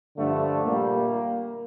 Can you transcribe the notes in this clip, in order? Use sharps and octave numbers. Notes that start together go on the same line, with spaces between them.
G2 D3 F3 A3 D4
A#2 G3 A#3